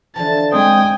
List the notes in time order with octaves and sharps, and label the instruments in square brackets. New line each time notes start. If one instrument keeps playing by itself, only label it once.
[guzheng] D3 E3 F3 [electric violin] A5
[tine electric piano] G#3 C4 C5 [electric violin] G5 G#5 [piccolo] D#6